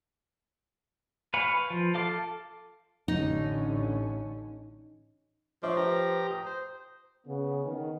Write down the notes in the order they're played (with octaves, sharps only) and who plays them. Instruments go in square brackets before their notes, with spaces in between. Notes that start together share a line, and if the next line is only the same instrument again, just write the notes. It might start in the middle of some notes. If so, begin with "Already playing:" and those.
[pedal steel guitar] B4 F5 G#5 B5 C#6
F3
A4 F5 D6
[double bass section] A1 D3 C#4 [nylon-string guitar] D#4
[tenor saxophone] F3 [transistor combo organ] D4 [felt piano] C#5 E5
[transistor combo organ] G4 A#5 [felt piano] B4
[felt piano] D#6
[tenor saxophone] C5
[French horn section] C#3 B3
D#3 B3